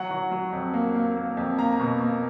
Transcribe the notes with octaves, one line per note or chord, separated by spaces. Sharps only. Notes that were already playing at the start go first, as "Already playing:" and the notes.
Already playing: F#3 F#5
F#3
F#3
F2
A#3
A#3
A#3
F2
A#3 A#5
B2
A#3